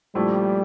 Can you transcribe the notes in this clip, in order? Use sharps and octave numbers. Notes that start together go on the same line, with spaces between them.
A#1 A#2 F3 G3 A3 E4